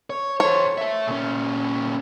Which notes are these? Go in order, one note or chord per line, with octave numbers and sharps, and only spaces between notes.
C#5
A4 C5 C#5
A4 E5
A#2 C#4